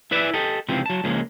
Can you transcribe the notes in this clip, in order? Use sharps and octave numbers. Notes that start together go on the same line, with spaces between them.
E4 B4 D5 E5
G4 A4 D#5
C#2 C3 E3 F3 C4 F4
F#3 A5
C#2 F3 G#3 A#3